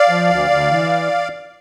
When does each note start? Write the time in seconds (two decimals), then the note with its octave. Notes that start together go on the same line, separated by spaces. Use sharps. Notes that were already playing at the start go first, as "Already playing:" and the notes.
Already playing: D5 F5
0.09 F3
0.30 D2
0.50 D2
0.71 E3